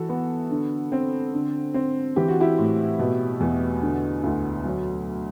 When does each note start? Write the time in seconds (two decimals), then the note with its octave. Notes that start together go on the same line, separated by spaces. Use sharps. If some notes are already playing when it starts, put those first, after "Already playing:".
Already playing: E3 F#4 A4
0.09 B3
0.51 D3
0.92 C4
1.34 D3
1.74 C4
2.16 E3 G4
2.28 F#4
2.40 E4 G4
2.58 A2
2.99 B2
3.40 E2
3.82 D3
4.24 D2
4.65 F#3